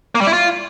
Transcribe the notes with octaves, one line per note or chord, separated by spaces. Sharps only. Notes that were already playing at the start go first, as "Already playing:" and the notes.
A#3
G3
E4
F4